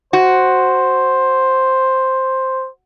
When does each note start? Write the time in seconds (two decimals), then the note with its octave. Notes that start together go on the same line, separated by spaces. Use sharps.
0.13 F#4 C5